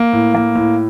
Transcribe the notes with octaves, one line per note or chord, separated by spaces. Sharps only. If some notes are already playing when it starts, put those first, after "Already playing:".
Already playing: A#3
A2
A#3
A2